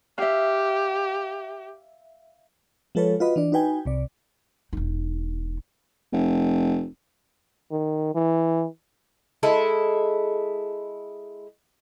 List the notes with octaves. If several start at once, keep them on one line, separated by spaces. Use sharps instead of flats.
G4 E5 F5
F3 G#3 F4 A4 B4 C#5
F4 F#4 B4 D#5 B5
E3 D4 D5
D#4 F#4 B4 G5 G#5
C2 C3 D5
E1 D#4
F1
D#3
E3
G#3 E4 A4